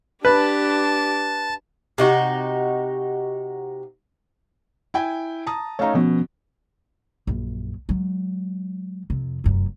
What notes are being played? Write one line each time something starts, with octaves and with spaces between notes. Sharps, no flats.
D4 G4 B4 A5
C3 D#4 F#4
E4 G5 G#5
A5 A#5 D#6
A3 C#4 D#4 C#5 F5 A#5
B2 F3 B3 C#4
A#1 F#2
F#3 G#3
F2 C3
F1 F#2